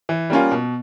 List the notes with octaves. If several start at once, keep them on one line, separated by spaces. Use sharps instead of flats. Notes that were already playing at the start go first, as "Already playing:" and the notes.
E3
G3 A#3 C#4 F4
B2